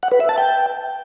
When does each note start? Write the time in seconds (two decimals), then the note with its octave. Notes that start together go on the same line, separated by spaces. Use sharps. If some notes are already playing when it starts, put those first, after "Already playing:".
0.03 F#5
0.12 B4
0.20 E5
0.29 A5
0.38 G5